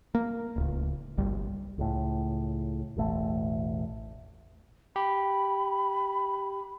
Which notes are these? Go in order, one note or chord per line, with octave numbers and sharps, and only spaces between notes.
A#3
D1 C#2
G1 C2 G3
C#2 A2
E1 A1 A3
G4 B5